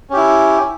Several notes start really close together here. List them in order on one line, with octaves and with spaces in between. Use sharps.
C#4 G4 E4